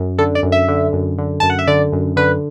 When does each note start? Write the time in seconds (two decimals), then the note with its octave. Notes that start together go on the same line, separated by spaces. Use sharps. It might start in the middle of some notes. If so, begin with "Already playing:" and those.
Already playing: F#2
0.19 D3 A4
0.35 D5
0.43 F#2
0.52 E5
0.68 D3
0.93 F#2
1.18 D3
1.40 F#2 A5
1.50 F#5
1.59 E5
1.67 D3 D5
1.92 F#2
2.16 D3 B4